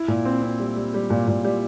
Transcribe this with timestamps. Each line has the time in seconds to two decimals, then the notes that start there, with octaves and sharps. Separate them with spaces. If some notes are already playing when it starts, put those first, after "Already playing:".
Already playing: E4
0.08 A#2
0.25 C4
0.42 C4
0.60 G3
0.76 G3
0.94 G3
1.10 A#2
1.28 A#2
1.44 G3